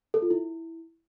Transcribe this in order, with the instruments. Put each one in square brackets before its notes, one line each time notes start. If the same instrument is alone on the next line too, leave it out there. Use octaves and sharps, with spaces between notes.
[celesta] A4
F4
E4